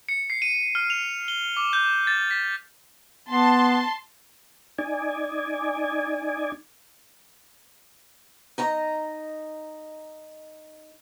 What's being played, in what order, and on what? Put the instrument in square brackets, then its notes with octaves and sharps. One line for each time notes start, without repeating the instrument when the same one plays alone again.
[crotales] C#7
C7
D#7
F6
F7
G7
D6
G6
A6
B6
[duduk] B3 [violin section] A5 C6
[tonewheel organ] D#4 D5 G#5
[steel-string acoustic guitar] D#4 D#5 A#5